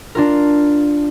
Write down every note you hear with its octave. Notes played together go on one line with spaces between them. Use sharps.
D4 F4 A#4